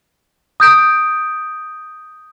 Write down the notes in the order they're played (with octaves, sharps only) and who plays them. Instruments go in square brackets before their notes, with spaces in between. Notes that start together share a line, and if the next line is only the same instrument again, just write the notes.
[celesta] D#6 G6 D7